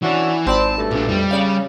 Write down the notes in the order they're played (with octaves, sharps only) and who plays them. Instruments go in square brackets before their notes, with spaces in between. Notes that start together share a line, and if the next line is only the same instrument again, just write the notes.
[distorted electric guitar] E3 [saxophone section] C#4 D4 F#4
[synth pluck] G#1 D5 B5 [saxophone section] C4 [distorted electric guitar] A5
[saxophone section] G2 B2 A3
[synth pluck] A#1 [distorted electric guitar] A#2 D4
[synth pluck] F2 [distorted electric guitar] G3
[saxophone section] C#3 [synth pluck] C#5 D5 F5